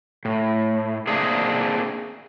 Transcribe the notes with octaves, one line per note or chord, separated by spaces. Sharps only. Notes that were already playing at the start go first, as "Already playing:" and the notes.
A2
A#3 C4 D4 E4 G#4